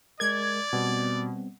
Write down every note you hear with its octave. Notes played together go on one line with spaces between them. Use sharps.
G#3 A#4 D5 G#6
B2 G3 B3 C4